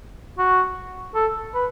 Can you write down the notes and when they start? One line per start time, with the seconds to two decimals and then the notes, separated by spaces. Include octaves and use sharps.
0.38 F#4
1.15 A4
1.54 B4